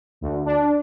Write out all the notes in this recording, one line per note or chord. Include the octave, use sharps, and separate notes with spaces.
D2
D4